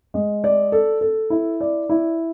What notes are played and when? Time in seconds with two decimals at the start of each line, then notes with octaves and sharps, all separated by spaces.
0.14 G#3
0.44 D5
0.72 A4
1.01 A4
1.30 E4
1.61 D5
1.89 E4